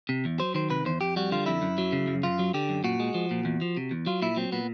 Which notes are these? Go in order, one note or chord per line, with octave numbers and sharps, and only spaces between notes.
C3
E2
F#3 C5
D#3 C5
C3 B4
E2 C5
F2 G4
G3 F#4
D3 F4
F2 E4
F#2
F#3
C#3
F#2
F#2 F4
F#3
D3 G4
F#2
A#2 F#4
G#3
F3
A#2
E2
F3
C3
E2
F#3 F4
A#2 E4
F#3 C4
A#2 B3